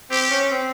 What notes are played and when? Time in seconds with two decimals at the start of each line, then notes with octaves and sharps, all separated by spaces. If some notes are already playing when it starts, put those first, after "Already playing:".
0.10 C4 G4
0.31 C#4
0.51 C4